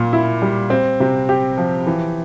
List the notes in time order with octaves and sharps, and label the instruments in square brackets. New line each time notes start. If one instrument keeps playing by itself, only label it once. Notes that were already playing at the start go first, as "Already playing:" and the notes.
Already playing: [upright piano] A#2 A#3
E4
G3
C4
C3
G4
F3
E3